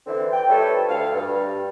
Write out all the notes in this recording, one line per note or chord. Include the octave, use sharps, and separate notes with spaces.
D3 E3 C4
G5
F3 G3 A3 A4 B4 C#5
D2 F5
G2